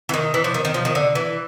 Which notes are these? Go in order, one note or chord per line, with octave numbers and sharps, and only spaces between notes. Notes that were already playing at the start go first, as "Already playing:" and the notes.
E3
D#3
E3
F3
D#3
D#3
F3
D#3
D3
E3